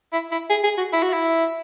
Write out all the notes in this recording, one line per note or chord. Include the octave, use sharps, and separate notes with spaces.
E4
E4
G#4
G#4
F#4
E4
F#4
E4